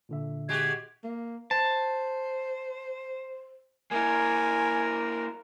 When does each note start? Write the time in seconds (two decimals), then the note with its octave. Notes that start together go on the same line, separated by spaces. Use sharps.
0.09 A#2 D3 E5
0.49 G#3 F#4 G4 G#6
1.04 A#3
1.51 C5 A5
3.91 A#3 E4 A#4 G#5